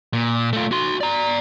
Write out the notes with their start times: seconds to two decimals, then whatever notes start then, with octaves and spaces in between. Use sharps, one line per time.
0.13 A#2
0.53 A3 F4
0.72 F#4 C6
1.01 D5 A#5